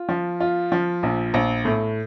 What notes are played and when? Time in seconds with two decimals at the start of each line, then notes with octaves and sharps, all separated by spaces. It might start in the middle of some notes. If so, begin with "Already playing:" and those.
Already playing: F4
0.09 F3
0.40 F4
0.72 F3
1.03 A#1
1.34 A#1
1.65 A2